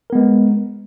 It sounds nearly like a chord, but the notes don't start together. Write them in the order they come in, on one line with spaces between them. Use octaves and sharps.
A#4 B3 G#3